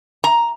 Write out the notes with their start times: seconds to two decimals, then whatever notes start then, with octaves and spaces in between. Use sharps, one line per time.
0.24 A#5